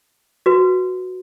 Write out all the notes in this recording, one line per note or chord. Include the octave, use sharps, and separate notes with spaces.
F#4 B4